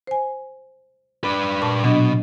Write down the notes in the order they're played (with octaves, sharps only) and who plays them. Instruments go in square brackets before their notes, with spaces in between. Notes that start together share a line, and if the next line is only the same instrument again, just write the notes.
[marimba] C5 G#5
[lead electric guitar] D4 B4
[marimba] A#2 A5 C#6
[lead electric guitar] B2 [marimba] F#3 D4 D#5